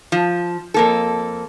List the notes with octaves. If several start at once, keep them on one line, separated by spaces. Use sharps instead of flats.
F3
F2 A#3 A4